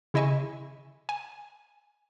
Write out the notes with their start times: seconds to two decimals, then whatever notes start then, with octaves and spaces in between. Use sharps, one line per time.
0.14 C#3 E4 D#5 E5 G#5 C#6
1.09 G#5